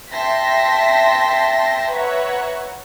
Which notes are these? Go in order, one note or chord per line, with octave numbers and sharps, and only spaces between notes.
E5 G5 A5 C6 A#6 B6
B4 C#5 E5 F#5 A#5